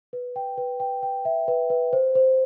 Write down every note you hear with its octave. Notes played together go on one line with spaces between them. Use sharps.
B4
G5
B4
G5
G5
E5
B4
B4
C5
C5